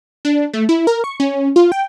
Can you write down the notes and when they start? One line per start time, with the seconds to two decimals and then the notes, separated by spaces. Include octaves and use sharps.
0.25 D4
0.54 A3
0.69 E4
0.87 A#4
1.04 C#6
1.20 C#4
1.56 F4
1.72 G5